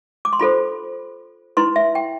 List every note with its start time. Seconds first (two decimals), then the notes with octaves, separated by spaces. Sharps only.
0.25 D6
0.33 C6
0.39 F4 A4 C5 B5
1.57 E4 B4 C6
1.76 E5
1.95 G5